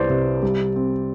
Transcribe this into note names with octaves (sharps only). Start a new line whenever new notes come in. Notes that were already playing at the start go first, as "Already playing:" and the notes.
Already playing: C2 B3 C5 D5
C3
G3
C4